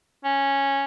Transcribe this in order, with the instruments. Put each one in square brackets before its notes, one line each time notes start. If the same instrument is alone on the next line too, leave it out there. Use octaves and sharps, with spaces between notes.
[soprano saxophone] C#4